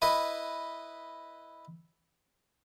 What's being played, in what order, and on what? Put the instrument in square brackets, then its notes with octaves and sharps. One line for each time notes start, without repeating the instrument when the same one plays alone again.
[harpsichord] E4 B4 D#5